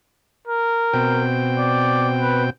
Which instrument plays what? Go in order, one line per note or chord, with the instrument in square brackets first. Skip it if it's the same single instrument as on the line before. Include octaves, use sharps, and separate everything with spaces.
[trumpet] A#4
[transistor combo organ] B2 C4 G5
[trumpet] D5
B4